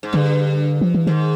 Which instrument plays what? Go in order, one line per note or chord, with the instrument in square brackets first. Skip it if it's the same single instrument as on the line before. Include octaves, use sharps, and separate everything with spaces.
[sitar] G#2
[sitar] G2 [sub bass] D3
[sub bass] F3
E3
[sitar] G#2 [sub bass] D#3